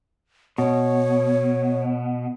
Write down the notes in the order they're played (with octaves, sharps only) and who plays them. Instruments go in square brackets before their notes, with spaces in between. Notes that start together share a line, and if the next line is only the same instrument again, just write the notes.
[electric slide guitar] B2 [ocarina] C#5